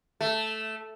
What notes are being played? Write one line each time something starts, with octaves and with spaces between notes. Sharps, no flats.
A3